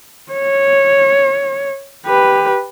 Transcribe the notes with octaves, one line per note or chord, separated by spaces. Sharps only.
C#5
G4 B4